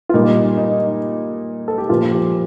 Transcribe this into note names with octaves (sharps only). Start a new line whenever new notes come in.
F4
A#2 G3 D#4
D#4
A4
G4
A#2 F3 F4
G4